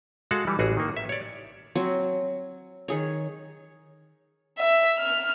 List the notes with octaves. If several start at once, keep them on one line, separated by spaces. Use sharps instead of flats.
G#3 F#4 A4 F5 F#5
E3 G3
A1 F#4 G#4
D#3 A#3
E5
C#5 D5
F#3 C4 G#5
D#3 G#4 C#5
E5
F6